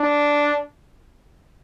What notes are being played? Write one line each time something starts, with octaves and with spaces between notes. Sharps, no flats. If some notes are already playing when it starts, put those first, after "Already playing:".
Already playing: D4